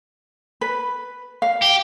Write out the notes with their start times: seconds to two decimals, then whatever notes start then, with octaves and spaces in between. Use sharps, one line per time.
0.61 B4
1.42 F5
1.62 G4